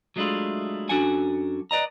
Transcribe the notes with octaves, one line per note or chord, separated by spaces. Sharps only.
F#3 G#3 A3 D4 E4 F4
F#2 D4 F#4 A4 F#5 G#5
B4 D5 D#5 A#5